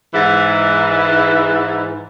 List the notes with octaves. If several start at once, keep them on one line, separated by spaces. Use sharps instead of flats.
G#2 E3